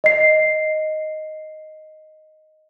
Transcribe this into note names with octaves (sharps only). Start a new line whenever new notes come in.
D#5 C7